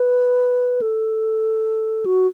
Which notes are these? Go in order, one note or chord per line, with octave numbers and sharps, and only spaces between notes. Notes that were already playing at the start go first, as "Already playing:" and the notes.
Already playing: B4
A4
F#4